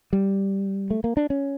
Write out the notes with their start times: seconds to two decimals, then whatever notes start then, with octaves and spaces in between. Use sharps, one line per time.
0.13 G3
0.90 A3
1.04 A#3
1.17 D4
1.30 C#4